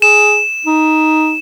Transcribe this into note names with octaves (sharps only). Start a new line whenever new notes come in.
G#4 E7
D#4